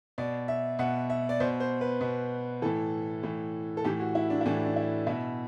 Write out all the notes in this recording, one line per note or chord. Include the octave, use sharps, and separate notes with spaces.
B2 D5
E5
B2 F#5
E5
D5
B2 C5
C5
B4
B2
A2 E3 A4
A2 E3
A4
A2 E3 G4
F#4
E4
D4
E4
A2 E3 D4
D4
E4
B2 E4